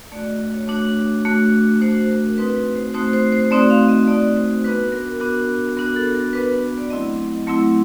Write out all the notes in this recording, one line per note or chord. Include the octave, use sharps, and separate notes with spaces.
A3 D4 F#4 D5
D#5
C#5
A3 D4 F#4
A3 D4 F#4
A3 D4 F#4 C5
A#4
A3 C4 D#4 F#4 B4
B4
C5
A3 C4 D#4 F#4 C5
C5
C5
A3 C4 D#4 F#4 D5
F5
D#5
A3 C4 D#4 F#4 D5
C5
B3 D4 F#4 B4
A#4
B3 D4 F#4
B3 D4 F#4 A#4
A4
A#4
B3 D4 F#4 B4
D5
F#3 A3 C4 E4 D#5
F#3 A3 C4 E4